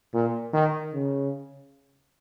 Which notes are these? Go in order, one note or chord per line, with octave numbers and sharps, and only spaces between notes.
A#2
D#3
C#3